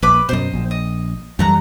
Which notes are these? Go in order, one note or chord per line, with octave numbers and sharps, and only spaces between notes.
A#1 B4 A5 D6
F#2 B2 C5 D5 D#5
A#1
D#5
F#2 E3 G3 A3 A#5 F#6